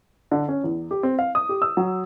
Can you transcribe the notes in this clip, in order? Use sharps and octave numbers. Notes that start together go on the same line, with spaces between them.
D3
C#4
E2
G4
C4
F5
D#6
G4
E6
F#3